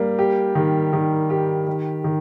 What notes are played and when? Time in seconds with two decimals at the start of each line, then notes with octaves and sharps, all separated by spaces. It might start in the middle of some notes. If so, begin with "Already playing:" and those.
Already playing: G3 A#3
0.19 G4
0.55 D#3
0.93 D#3
1.30 G4
1.67 D#3
2.04 D#3